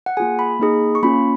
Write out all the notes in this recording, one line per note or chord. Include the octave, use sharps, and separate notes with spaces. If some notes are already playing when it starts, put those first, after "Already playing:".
F#5
A#3 F4 G#4 G#5
B5
A#3 D#4 G#4
C#6
A#3 C#4 F4 B5